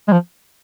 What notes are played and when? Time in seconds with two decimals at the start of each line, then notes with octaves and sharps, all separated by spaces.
0.08 G#3
0.12 F3